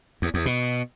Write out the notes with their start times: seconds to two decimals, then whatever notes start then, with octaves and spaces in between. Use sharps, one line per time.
0.22 E2
0.34 E2
0.46 B2